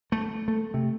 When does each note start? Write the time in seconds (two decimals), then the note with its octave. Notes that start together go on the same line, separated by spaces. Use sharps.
0.12 A3
0.48 A3
0.74 C3